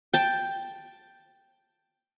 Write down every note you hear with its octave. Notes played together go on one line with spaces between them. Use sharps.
G5 A5